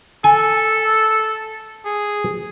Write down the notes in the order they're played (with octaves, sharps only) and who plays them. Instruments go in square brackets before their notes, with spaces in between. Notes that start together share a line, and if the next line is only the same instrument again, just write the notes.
[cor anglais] A4 [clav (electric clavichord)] G#5
[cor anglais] G#4